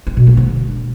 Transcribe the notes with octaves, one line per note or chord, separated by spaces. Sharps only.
C4
B2
A#3
D3